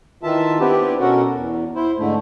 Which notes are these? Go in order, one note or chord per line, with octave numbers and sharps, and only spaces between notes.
D#3 E3 F4 E5 A5
B3 C4 D4 E4 G4 B4
B2 C#4 F#4 A4 A#4 F#5
E2
E4 C5
G#2 D3 A3